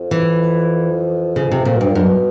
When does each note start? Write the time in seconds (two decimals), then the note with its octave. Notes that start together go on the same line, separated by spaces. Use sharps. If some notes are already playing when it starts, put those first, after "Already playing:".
Already playing: F2
0.11 E3
1.36 C#3
1.52 C3
1.65 F2 A#2
1.77 G2 B2
1.88 A#2
1.95 F#2 B2